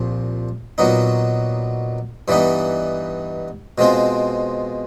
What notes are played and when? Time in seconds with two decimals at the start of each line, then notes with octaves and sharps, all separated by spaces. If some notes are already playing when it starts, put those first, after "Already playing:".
Already playing: C2 A#2 F3
0.78 A#2 F#3 B3 D#4
2.28 G2 E3 G3 B3 D#4
3.78 B2 G#3 C4 F4